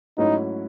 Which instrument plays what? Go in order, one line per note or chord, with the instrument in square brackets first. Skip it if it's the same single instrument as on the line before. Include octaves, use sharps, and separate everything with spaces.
[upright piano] G#2 F#3 A3 C#4 E4 [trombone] D#4